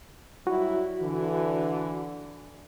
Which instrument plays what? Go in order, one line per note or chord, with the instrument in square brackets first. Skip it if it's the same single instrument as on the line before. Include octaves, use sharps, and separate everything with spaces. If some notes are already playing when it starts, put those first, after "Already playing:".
[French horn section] F#3 G3 E4 [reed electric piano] F#4
[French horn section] D3 E3